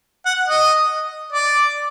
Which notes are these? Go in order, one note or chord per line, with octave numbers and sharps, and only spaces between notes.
F#5
D#5
D5